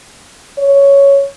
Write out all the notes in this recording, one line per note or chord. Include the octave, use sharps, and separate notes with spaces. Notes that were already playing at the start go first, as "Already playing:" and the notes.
C#5